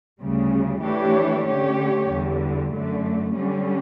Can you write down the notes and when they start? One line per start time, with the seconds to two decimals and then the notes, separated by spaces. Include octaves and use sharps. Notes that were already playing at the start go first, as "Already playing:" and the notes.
0.19 D2 C#3 G3
0.82 E3 A3 D4 G4 C#5
1.46 D3 A3 C#4 G4 C#5
2.09 E2 D3 G3
2.72 F#2 D3 A3
3.35 D3 G3 C#4